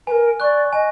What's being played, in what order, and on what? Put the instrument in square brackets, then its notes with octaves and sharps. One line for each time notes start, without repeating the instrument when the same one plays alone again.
[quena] A#4 B4 [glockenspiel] G#5
[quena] D5 [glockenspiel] C#6 F#6
[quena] D#5 [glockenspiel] G#5